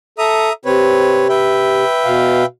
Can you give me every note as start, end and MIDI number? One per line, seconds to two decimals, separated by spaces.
0.18 0.49 69
0.18 0.53 76
0.18 0.53 82
0.18 0.53 87
0.65 1.84 48
0.65 1.28 60
0.65 1.28 71
0.65 1.28 73
1.29 2.46 71
1.29 2.46 76
1.29 2.46 79
2.05 2.43 47
2.05 2.43 77